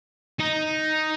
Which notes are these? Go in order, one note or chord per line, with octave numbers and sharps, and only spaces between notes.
D#4